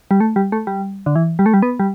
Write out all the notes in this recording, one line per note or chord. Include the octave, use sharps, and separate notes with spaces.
G3
A3
G3
A3
G3
D3
E3
G3
A3
G3
B3
G3